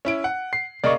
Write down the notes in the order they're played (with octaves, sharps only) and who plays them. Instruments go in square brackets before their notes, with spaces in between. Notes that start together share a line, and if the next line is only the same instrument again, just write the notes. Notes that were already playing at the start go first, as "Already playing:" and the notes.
[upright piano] C#4 E4 D7
F#5
[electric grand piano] C7
[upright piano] C#3 A#3 [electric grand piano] D5 D#5 C#6